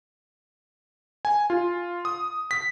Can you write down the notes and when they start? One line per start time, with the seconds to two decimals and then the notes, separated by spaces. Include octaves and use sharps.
1.25 G#5
1.50 F4
2.05 D#6
2.51 B6